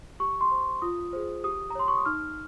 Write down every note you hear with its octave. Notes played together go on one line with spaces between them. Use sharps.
G4 C#6
C6
C5
F4 D#6
G#4 C5
G4 D#6
A#5
C#5 C6
C#6
D#6
D#4 F6